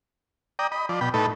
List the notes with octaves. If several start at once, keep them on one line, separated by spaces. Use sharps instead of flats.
D5 G5 A#5 D#6
D#5 B5
F3 D5
B2 G5 B5
A2 A3 D#4 A4 B4